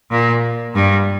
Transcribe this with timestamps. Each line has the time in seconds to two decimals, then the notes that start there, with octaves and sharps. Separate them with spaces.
0.11 A#2
0.74 G2